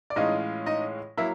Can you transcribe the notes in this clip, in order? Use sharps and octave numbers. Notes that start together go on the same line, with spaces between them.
D5
A2 E3 G#3 C#4 D#4 F4 D#5
D#4 D#5
F#3 A#3 E4 E5